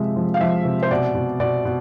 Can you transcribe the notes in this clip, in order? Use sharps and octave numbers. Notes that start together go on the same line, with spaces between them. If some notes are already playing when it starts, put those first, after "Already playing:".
Already playing: C3 F3 G#3 E5
F3
F5
F3 E5
C3
C5
B2 D5
B2
B2 D5
B2